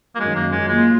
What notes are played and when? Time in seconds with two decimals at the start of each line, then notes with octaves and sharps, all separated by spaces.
0.15 A#3
0.19 F#2 D#3 F#3 G#3
0.36 A#3
0.52 G#3
0.68 G#3 A#3 F4